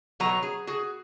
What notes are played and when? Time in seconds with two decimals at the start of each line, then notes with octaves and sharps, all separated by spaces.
0.20 B2 F#3 C#5 A#5
0.43 G#4
0.67 F#4 G#4